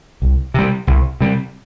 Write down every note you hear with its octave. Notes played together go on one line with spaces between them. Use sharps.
C2
C3 G3
C2
C3 G3